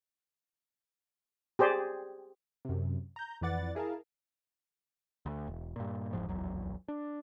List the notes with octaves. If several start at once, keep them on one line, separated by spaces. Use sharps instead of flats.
G4 G#4 C5 D5
F#2 C3
A#5 G6
F2 E3 B4 D5 F#5 A6
E4 G#4 A#4 F5 A5
D2
E1
G2 A#2
F1 E2 G#2 F3
D1 A#1 E2 F#3
D4